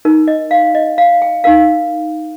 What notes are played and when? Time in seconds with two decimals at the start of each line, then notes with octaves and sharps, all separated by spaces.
0.05 D#4 A#4
0.27 D#5
0.51 F5
0.75 D#5
0.98 F5
1.22 G5
1.44 D#4 A#4 F5